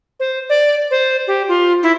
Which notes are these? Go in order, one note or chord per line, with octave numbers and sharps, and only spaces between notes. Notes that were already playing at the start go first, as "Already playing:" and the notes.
C5
D5
C5
G4
F4
E4